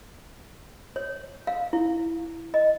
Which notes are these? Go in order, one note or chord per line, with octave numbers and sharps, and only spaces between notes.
C#5
F5
E4
D#5